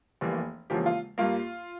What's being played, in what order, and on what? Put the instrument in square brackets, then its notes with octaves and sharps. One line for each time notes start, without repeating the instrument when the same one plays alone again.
[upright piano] F1 E2 E3 G3 A#3
E1 E2 C#3 F3 A#3 G4
F4
G2 G3 A#3 F4